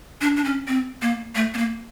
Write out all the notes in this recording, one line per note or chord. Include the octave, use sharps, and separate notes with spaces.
D4
D4
C#4
C4
A#3
A3
B3
A#3